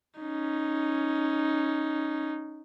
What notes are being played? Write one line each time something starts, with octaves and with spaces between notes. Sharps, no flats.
C#4 D#4